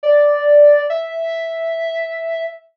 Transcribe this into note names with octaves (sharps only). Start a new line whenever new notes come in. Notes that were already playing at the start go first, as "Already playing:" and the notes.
D5
E5